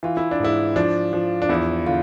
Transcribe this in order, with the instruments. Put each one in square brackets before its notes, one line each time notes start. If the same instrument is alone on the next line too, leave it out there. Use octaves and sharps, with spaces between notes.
[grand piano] E3 F4
E4
D4
G#2 E4
F3 D4
F3
D4
E2 E4
D3 F4